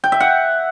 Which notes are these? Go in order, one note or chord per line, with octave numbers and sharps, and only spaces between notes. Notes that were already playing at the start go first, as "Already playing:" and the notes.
G5
E5
F#5